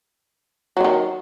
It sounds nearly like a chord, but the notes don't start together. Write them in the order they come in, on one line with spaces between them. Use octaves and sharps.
F#3 D3 D#3